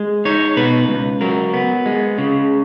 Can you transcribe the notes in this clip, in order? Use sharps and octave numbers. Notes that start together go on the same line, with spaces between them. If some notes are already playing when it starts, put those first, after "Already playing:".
Already playing: G#3
D#4 C#5
B2 B4
C#2
F#3 A#4
B3
G#3
C#3